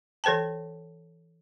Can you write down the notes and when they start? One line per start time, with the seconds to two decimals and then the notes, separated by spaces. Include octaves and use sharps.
0.24 E3 A4 C5 G5 A5